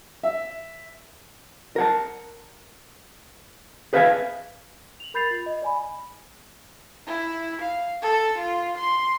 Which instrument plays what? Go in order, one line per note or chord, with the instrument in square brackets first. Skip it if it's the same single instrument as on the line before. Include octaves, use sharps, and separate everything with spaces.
[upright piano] E5
[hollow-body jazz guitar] A#4 F#5 A5
G#4 B4 E5 F5 G5 G#5
[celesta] F7 F#7
A#4 B5 G6 A6 C7 F7
F4
D#5
D5 G#5 B5
[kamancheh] E4
F5
A4
F4
C6